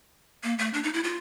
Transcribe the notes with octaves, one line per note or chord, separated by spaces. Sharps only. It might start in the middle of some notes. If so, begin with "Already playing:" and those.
A#3
A3
D4
D#4
E4
F4